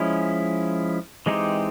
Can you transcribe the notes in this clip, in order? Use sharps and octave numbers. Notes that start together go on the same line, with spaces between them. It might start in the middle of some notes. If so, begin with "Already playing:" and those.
Already playing: F3 G#3 C#4 E4
E3 G#3 C4 D#4 G4